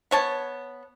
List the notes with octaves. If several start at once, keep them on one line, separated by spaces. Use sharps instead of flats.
B3 C#5 A5